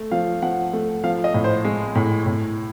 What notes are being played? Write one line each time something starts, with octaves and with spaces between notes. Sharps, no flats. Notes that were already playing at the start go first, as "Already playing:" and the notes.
Already playing: A3
F3 F5
F3 F#5
A3
F3 F5
D#5
A2
C5
G#3
A2
A2